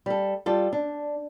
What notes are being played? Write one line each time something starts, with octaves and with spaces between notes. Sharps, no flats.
G3 A4
G3 F4 A4
D4